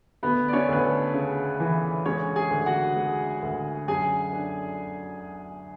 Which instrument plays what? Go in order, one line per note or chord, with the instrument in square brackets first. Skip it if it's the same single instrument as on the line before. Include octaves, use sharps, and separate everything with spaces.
[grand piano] D2 [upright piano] B3 B4
[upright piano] D5
C#4 C#5
[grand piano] D2 [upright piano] B4
[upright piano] A3 A4
[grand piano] C#3
E3
[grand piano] G#3 [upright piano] C#4 C#5
[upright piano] G#4 G#5
[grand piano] D2
[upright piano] F#4 F#5
[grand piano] G#3
D2
[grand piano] F#2 [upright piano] G#4 G#5
[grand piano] D4